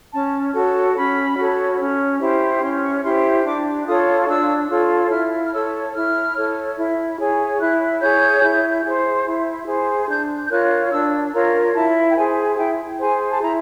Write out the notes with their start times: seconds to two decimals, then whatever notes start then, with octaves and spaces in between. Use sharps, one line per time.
0.12 C#4 A5
0.54 F#4 A4 C#5
0.96 C#4 B5
1.37 F#4 A4 C#5
1.79 C#4
2.21 E4 G4 C5
2.62 C#4 C6
2.83 C#6
3.03 E4 G4 C5 C6
3.44 D4 D6
3.86 F4 A4 C#5 D#6
4.28 D4 E6
4.69 F4 A4 C#5
5.11 E4 F6
5.43 F6
5.52 A4 C#5 E6
5.93 E4 F6
6.35 A4 C#5
6.77 E4
7.18 G#4 C#5
7.60 E4 F#6
8.01 G#4 C#5 G6
8.42 E4
8.84 G#4 C5
9.25 E4
9.67 G#4 C5
10.09 D4 G6
10.46 G6
10.50 F4 A#4 C#5 F#6
10.91 D4 E6
11.33 F4 A#4 C#5 A#5
11.75 E4 A5
12.10 G5
12.16 G#4 C5 G#5
12.57 E4 G5
12.99 G#4 C5 G#5
13.30 A5
13.41 E4 A#5